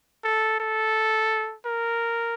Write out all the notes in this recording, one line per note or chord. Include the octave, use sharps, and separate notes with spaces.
A4
A4
A#4